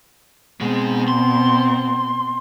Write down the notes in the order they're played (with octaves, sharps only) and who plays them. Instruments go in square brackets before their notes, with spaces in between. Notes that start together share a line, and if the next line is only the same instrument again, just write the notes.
[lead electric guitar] G#2 G#3 [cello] B2 C4
[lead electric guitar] C6